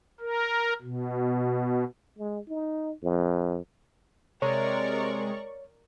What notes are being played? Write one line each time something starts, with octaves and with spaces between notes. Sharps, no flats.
A#4
B2
G#3
D#4
F2
C3 G#3 A#4 C#5 D5 C#6